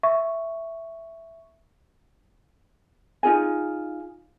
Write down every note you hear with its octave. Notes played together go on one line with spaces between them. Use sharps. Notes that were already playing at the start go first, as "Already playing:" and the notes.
E5 C#6
D#4 F4 G#4 G#5